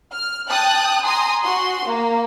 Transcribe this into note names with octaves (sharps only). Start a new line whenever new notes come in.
F6
G5 A5 D#6 F#6
G#5 A#5 C6 D#6
F#4 C6
A#3